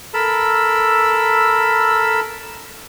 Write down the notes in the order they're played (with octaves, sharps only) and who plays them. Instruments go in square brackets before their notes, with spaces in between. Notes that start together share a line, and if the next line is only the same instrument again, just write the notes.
[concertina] A4 A#4 B5 E6